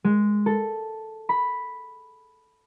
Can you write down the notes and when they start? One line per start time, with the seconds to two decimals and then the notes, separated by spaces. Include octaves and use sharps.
0.04 G#3
0.46 A4
1.29 B5